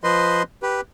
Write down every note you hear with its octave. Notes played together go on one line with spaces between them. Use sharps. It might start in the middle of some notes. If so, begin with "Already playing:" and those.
F3 B4 C5 D#5 C6
G4 B4